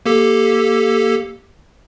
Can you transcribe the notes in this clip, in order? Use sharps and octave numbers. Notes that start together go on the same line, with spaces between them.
A#3 G4 A4